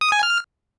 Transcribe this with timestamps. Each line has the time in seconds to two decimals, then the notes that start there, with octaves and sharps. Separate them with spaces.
0.01 D#6
0.12 G#5
0.23 F6